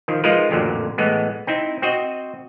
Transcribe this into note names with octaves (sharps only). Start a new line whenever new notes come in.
D#3 F3
F3 G#3 D#4 F4 A#4 B4
A1 F2 A#2 D3 F#3
A2 E3 G#3 B3
C4 D#4 E4
C4 F#4 D#5